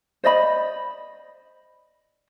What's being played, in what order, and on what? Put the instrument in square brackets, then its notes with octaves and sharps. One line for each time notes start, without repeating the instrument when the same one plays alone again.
[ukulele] C5 D5 D#5 B5